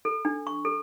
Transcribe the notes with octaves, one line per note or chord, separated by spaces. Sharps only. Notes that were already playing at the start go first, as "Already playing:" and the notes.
A4
D4
C#6
A4